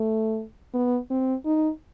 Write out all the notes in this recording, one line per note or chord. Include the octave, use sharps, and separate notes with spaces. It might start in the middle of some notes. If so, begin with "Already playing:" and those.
Already playing: A3
B3
C4
D#4